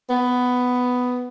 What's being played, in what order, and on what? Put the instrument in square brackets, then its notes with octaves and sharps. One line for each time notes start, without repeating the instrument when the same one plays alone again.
[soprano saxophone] B3